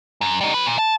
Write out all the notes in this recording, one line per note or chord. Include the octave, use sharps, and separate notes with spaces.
F#2
G3 D#4
F#3 B4
A#2
A5